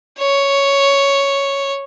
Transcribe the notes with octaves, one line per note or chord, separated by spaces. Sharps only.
C#5